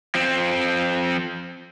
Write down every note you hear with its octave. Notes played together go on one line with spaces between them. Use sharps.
F3 C4